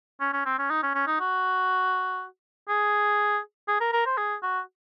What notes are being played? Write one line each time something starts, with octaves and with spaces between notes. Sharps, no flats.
C#4
C#4
C4
C#4
D#4
C#4
C#4
D#4
F#4
G#4
G#4
A#4
A#4
C5
G#4
F#4